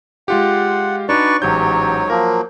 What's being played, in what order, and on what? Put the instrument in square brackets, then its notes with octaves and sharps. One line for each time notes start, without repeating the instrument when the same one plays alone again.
[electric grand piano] G#3 F4 G4 [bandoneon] F#5
[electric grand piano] D4 D#4 F#4 [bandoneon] B4 D5 C#6
[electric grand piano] A1 G4 G6 [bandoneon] G#2 F#3 C#5
[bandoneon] F3 F#3 A#3 [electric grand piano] A#4